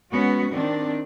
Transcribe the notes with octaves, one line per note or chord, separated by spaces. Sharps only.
G#3 B3 C#4 F#4
D#3 C4 D4